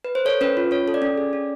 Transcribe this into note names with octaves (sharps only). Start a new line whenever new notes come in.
B4
C5
A4 C#5
C#4 B4
F4
C#4 C#5
A4
D5
C#4
G#4
C#4